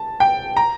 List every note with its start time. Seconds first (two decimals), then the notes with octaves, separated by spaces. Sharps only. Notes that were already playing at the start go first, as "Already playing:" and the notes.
Already playing: A5
0.20 G5
0.57 A#5